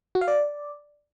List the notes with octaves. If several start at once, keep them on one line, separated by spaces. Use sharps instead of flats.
F#4
F5
D5